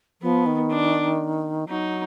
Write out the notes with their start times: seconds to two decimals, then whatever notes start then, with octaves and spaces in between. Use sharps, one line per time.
0.21 F3 B3
0.46 D#3
0.70 D4
1.68 F#3 D#4